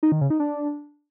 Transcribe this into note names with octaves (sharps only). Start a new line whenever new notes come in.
D#4
D#3
C#3
D#4
D4